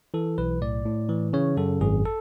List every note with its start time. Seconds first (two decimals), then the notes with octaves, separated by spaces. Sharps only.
0.14 E3 A4
0.38 B1 B4
0.62 A2 D5
0.86 A2
1.09 E3
1.33 C#3 C#5
1.57 F#2 A4
1.81 G#1 G#4
2.05 A4